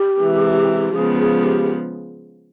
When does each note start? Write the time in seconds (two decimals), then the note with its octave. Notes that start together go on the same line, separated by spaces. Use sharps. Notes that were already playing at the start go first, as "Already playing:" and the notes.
Already playing: G4
0.22 C3 E3 G#3
0.95 C#3 F3 G#3 B3 G#4
1.20 G#4
1.44 G4